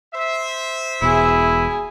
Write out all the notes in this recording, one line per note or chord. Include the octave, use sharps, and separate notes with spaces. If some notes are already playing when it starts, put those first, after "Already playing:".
C5 E5
E1 B2 E4 G#4